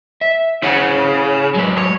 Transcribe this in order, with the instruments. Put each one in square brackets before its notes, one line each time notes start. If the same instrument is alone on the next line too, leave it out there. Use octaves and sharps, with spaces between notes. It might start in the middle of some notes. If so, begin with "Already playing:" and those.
[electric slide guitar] E5
[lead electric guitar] C#3 [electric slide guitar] E4 C#5 F#5
[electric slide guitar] F#3 G#3 B4
[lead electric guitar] C#5